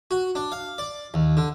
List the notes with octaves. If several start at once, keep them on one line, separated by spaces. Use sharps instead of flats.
F#4
D4
F5
D5
D#2
D3